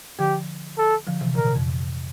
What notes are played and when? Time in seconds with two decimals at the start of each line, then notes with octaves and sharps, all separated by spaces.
0.19 D3 F3 G4
0.78 A4
1.07 D3 F3
1.21 C3 E3
1.36 A#2 D3 A#4
1.47 C3
1.56 F2